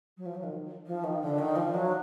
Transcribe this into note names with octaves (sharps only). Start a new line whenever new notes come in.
F#3
F3
F#3
D#3
F3
D#3
D3
D#3
F3
F#3